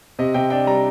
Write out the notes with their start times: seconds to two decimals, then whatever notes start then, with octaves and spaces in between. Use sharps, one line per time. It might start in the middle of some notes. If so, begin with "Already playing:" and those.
0.19 C3 D#5
0.34 C3 G5
0.50 D4 G5
0.67 G3 A#5